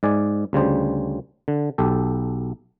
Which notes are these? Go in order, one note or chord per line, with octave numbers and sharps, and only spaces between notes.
G#2 D5 G#5
D2 C#3 G3 C5
D3
B1 G4 A4